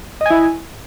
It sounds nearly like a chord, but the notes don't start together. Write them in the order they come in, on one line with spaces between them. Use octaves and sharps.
D#5 G#5 E4